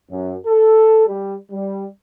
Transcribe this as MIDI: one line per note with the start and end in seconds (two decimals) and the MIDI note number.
0.11 0.35 42
0.47 1.05 69
1.08 1.35 55
1.51 1.87 55